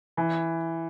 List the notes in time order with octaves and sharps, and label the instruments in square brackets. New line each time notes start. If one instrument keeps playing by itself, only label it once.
[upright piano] E3